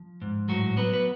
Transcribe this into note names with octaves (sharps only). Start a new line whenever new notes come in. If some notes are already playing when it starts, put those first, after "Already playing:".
Already playing: F3
G#2
A2 F#3 F#4
F#3 B3 B4
B4